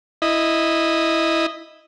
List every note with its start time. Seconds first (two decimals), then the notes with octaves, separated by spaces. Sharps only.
0.22 E4 D#5